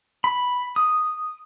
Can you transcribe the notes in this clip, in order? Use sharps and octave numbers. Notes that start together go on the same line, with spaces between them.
B5
D#6